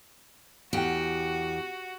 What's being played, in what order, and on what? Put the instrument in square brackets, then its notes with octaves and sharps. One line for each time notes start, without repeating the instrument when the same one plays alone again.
[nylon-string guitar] E2 F#5 G5 [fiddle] F#4 [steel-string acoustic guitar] G4